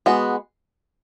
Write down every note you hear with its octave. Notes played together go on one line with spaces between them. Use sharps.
G#3 B3 F#4